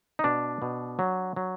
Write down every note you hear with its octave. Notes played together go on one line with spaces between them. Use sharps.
D#4
B2 D4
B2
F#3
F#3